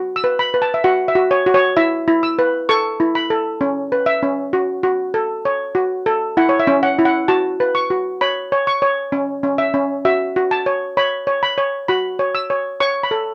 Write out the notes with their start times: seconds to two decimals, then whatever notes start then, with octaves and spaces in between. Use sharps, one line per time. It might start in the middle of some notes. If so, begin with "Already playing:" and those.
Already playing: F#4
0.16 E6
0.24 B4
0.39 B5
0.54 B4
0.62 A5
0.74 E5
0.84 F#4 F#5
1.08 E5
1.15 F#4
1.31 C#5
1.46 F#4
1.54 C#5
1.77 E4 E5
2.08 E4
2.23 E6
2.39 B4
2.69 A4 C#6
3.00 E4
3.15 B5
3.30 A4
3.61 C#4
3.92 B4
4.06 E5
4.23 C#4
4.53 F#4
4.83 F#4
5.14 A4
5.45 C#5
5.75 F#4
6.06 A4
6.37 E4 F#5
6.49 C#5
6.60 E5
6.67 C#4
6.83 F#5
6.99 E4
7.05 F#5
7.28 F#4 A5
7.60 B4
7.75 C#6
7.90 F#4
8.21 C#5 B5
8.52 C#5
8.67 C#6
8.82 C#5
9.12 C#4
9.43 C#4
9.58 E5
9.74 C#4
10.05 F#4 E5
10.36 F#4
10.51 A5
10.66 C#5
10.97 C#5 B5
11.27 C#5
11.43 B5
11.58 C#5
11.88 F#4 B5
12.19 C#5
12.35 E6
12.50 C#5
12.80 C#5 C#6
13.03 B5
13.11 A4